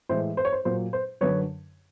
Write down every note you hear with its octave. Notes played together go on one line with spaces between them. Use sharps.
A2 E3 G#3 C5
C5
C#5
C5
A#2 F#3 C5
C5
F#2 D3 F#3 B4 C#5